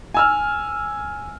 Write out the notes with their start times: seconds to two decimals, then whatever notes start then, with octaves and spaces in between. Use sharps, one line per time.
0.14 G#5 E6 F6